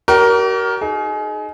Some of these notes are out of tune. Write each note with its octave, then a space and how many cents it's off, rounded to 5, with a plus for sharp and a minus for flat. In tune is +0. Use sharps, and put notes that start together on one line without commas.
G4 -45 A#4 +10 C#5 +45
D#4 +0 G#4 +30